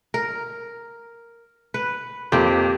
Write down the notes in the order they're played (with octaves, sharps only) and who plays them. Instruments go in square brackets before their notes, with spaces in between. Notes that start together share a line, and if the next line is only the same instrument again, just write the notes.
[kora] A#4
B4
[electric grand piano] F2 [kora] A#3 C4 G4